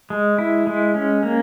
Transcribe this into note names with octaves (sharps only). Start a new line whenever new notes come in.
G#3
E4
G#3
C#4
A#3